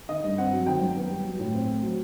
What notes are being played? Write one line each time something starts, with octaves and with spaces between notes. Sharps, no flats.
D#3 D#5
G2
C4 F#5
F#3
D#3 G5
F#2
B3
G3
F#3
A2
C4
A3
F#3